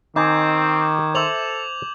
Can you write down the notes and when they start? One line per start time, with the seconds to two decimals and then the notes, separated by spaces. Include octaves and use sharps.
0.16 D#3 C4 D#4 G#5 D6 G6 G#6
1.15 A4 C5 E5 D6 F7 F#7